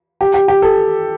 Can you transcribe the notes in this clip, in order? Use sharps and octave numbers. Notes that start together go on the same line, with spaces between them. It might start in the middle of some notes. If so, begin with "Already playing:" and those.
G4
G4
G4
A4